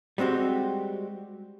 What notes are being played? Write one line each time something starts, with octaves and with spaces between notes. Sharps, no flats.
G3 G#3 C4 F#4 G4